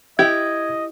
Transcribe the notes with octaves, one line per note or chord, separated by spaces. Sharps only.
E4 G4 D#5 G#6